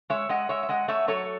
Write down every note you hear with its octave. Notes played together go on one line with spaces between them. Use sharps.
G#3 C#5 E5
G#3 D#5 F#5
G#3 C#5 E5
E5
G#3 D#5 F#5
A3 C#5 E5
F#3 A4 C#5